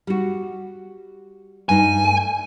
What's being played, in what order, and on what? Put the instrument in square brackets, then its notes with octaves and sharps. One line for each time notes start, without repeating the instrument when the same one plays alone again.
[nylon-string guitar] G3 F#4
[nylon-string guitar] G2 D#4 [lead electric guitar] G#5
[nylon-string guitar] A3